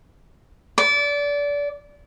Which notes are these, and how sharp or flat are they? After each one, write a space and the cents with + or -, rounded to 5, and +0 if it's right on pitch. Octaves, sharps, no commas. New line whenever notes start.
D5 -25